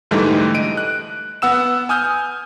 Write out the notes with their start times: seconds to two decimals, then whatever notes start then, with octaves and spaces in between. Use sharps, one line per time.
0.11 G#2 D3 E3 G3 A3 D#4
0.54 D#5 D7 D#7
0.77 F#6
1.42 B3 F#5 E6 E7
1.89 G#5 D#6 F6 G6